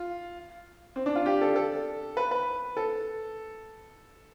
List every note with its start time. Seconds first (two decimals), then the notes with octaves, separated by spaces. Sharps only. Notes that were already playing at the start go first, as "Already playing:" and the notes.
Already playing: F4
0.96 C4
1.06 D4
1.16 F4
1.26 G4
1.41 A4
1.56 A4
2.17 B4
2.31 B4
2.77 A4